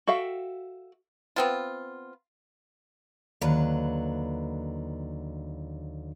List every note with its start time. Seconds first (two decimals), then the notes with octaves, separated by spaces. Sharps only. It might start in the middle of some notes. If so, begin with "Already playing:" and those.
0.07 F#4 A4 E5 F5 G5
1.36 B3 C4 F4
3.41 D#2 D3 F#3 B4